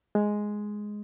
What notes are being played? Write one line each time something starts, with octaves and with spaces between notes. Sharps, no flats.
G#3